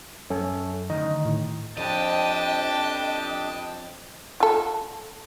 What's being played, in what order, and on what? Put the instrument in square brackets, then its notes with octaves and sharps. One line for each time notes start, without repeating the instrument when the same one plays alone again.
[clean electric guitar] F#2 [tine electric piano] C#4 A4
[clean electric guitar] D2 G2 D#3 [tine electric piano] D#5
[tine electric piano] A2
[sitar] F2 [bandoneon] D4 G4 B4 [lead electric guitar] D#5 [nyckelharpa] G5 A5
[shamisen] F4 A4